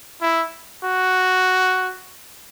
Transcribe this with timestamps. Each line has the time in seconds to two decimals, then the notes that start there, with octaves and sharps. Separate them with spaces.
0.22 E4
0.84 F#4